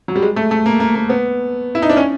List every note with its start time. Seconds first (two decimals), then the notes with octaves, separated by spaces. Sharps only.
0.08 F#3
0.16 G3
0.22 G#3
0.36 A3
0.51 A3
0.66 A#3
0.80 A#3
0.95 A#3
1.09 B3
1.75 E4
1.82 D#4
1.89 D4
1.97 C#4